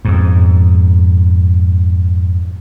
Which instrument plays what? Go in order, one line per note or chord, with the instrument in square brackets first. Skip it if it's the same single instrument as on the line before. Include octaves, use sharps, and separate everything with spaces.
[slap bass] F2 G#2